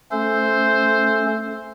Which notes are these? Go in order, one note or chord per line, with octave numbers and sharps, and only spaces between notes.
A3 C#4 A4 C5